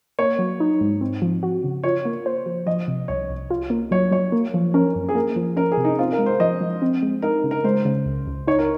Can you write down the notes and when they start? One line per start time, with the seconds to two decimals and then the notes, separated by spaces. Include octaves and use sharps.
0.19 A#3 C#5
0.39 F#3
0.60 D#4
0.81 G#2
1.01 C4
1.22 F3
1.43 F#4
1.64 C#3
1.84 F4 C#5
2.05 A#3
2.26 C5
2.46 F3
2.66 F3 D#5
2.88 C3
3.08 C2 C#5
3.30 C2
3.51 F4
3.70 A#3
3.91 F#3 C#5
4.12 F#3 C#5
4.32 A#3
4.54 F3
4.74 C#4 A#4
4.95 F#2
5.09 G#4
5.15 A#3 A#4
5.36 F3
5.57 C#4 A#4
5.72 G#4
5.78 C3
5.84 D#4
5.99 C4 F4
6.12 A#4
6.19 G#3
6.26 C5
6.40 F3 D#5
6.61 F3
6.82 C4
7.03 G#3
7.22 D#4 A#4
7.44 C#3
7.51 A#4
7.64 G#3 C5
7.85 C#3
8.06 C#2
8.27 C#2
8.47 D#4 C#5
8.59 A#4